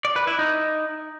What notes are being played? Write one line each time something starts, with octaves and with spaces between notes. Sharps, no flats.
D5
B4
E4
D#4